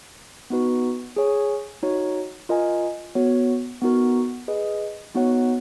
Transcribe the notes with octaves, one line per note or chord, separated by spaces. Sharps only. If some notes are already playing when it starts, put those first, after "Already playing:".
B3 D#4 F#4 B4
G#4 C#5 G#5
D#4 F#4 C#5
F4 A#4 D#5 G#5
B3 F#4 C#5
B3 D#4 F#4 A#4
G#4 B4 D#5
B3 D#4 F#4 C#5 F#5